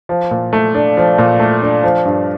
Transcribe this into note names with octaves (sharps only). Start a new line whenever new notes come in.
F3
A#2
A3
D4
F3
A#2
A3
D4
F3
G2